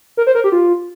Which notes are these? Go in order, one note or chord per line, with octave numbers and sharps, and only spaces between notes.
A#4
C5
A#4
G4
F4